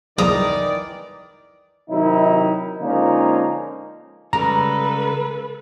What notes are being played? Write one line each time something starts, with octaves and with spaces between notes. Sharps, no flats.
C2 F2 D#3 E3 A4 D5 A#5 D#6
C3 D#3 F#3 D#4 E4
D3 F3 G#3 A#3 C#4 D#4
C#3 G3 G#3 A4 B4 A#5